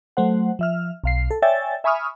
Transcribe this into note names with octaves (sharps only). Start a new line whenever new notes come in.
F#3 A3 C5 F#5
F3 E5 F6
B1 F5 C7
A4
C#5 D5 E5 G5 G#5 A6
E5 G#5 B5 C#6 D#6 F6